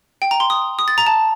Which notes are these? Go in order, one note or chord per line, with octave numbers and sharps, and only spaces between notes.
G5
A#5
C6
D#6
D#6
A6
A#5
A5